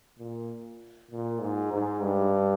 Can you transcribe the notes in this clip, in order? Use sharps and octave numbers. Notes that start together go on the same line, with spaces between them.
A#2
A#2
G#2
G#2
G2